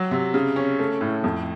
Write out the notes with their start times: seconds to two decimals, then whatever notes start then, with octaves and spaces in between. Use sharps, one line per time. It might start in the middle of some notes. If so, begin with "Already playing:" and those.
Already playing: F#3
0.11 C3
0.34 C#3
0.56 C#4
0.79 A3
1.01 A2
1.24 F2